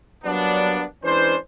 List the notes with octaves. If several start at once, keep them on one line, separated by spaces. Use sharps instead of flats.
F#3 G3 A#3 B3 D4
E3 G#3 C#4 D4 B4 C5